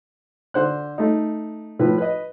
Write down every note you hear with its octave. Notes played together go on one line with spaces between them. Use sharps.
D3 C5 F#6
A3 D#4
A2 F3 B4
B4 D#5